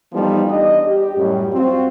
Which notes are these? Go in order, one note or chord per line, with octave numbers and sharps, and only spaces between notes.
E3 F3 G3 A3 B3 D#4
E2 G3 D4 D#5
G4
F#2 A2 G3
C4 F4 F#4